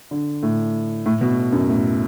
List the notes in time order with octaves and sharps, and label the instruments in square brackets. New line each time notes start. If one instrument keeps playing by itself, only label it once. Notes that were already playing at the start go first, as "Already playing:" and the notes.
[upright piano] D3
A2
A2
B2
F#2
A2